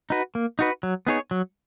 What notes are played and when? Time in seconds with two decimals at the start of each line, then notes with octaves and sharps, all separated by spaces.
0.10 D#4 F#4 B4
0.35 A#3
0.59 D#4 F#4 B4
0.83 F#3
1.07 B3 D#4 G#4 C#5
1.31 F#3